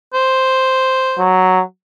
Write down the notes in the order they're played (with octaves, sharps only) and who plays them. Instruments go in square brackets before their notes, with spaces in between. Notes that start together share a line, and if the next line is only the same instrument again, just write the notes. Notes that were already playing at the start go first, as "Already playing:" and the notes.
[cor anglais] C5
[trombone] F#3